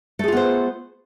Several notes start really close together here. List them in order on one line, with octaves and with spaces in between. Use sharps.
A3 G#4 F4 B3 C5